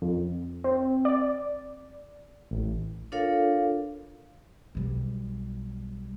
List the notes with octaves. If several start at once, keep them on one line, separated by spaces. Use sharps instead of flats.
F2
C4
D5
A1
D4 F4 A4 A#4 C#5 F5
B1 G3